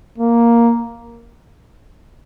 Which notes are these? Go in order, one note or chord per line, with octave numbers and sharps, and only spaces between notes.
A#3